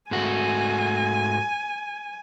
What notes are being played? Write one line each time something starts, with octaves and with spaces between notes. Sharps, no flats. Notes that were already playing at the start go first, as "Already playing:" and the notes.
G#2 A3 F#4 G#5